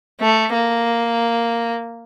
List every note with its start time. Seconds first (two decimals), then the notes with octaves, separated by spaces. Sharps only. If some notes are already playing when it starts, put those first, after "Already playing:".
0.21 A3
0.53 A#3